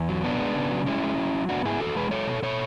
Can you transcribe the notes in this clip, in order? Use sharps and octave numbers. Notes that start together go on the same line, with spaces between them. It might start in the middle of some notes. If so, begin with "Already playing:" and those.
Already playing: E2
F#3
B2 B3 D4
G#3
C#3
F#3
G#3 C#4 E4
G#3
F#3
F#3
B3 D4 F#4
G#2 E4 G#4
E2 F#4 A4
G#3 G#4 B4
F#3 A4 C#5
B2
B2 A4 C#5